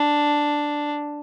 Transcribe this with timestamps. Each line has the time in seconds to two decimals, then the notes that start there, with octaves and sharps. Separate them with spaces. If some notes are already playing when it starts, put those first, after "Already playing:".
Already playing: D4